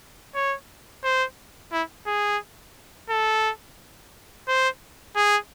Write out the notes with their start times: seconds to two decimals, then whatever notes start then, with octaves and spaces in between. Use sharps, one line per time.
0.35 C#5
1.04 C5
1.72 E4
2.07 G#4
3.10 A4
4.48 C5
5.16 G#4